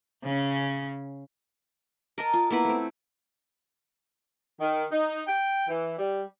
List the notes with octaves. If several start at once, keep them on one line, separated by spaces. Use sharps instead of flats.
C#3 C#4
A#4 D#5 A5
F4
A#3 B3 E4 B4
A3 C4
D#3
D#4
G5
E3
G3